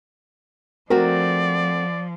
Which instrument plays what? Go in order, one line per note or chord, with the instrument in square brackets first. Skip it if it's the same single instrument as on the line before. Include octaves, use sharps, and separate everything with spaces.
[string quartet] F3 [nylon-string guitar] A3 C4 F#4 [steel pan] A#4 [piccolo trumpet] D5